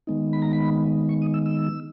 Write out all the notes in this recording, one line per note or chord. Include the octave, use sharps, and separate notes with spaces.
D#3 G#3 B3 D#4
B5
A#5
B5
C#6
D#6
E6
E6